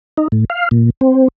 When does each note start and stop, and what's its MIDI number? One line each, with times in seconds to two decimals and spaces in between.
0.18 0.28 63
0.32 0.45 45
0.50 0.69 77
0.71 0.90 46
1.01 1.28 60